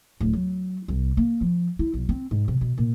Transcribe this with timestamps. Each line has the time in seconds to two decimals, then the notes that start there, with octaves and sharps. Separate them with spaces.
0.20 D1
0.33 F#3
0.88 C2
1.17 A#3
1.41 F3
1.79 E4
1.94 B1
2.09 C4
2.31 G#2
2.48 C3
2.61 B2
2.78 A#2